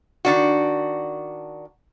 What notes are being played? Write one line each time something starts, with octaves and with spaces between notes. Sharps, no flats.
D#3 D4 F#4